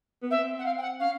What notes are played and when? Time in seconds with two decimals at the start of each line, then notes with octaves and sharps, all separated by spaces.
0.22 B3
0.31 C4 E5
0.59 F#5
0.65 F5
0.78 G5
0.82 F#5
1.00 C#4 F5